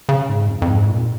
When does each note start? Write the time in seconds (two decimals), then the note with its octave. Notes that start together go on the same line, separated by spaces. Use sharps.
0.09 C#3
0.29 G#2
0.48 F2
0.62 F2
0.70 G#2
0.89 A#2